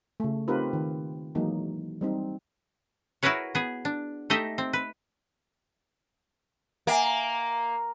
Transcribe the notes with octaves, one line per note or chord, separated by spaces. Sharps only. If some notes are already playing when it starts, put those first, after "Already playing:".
C#3 A3
C4 D#4 F4 G4 A#4 B4
D#3
E3 F#3 G#3 A#3 D#4
G3 C4 D#4
E4 F#4 G#4 A#4 B4 C#5
B3 G#4
D4
A3 D#4 G4 D#5 E5
C4
B4
A#3 E5 F#5 G#5